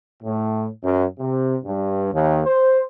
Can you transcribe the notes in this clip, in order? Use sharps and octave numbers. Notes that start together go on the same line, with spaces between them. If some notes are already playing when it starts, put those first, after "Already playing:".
A2
F#2
C3
G2
D#2
C5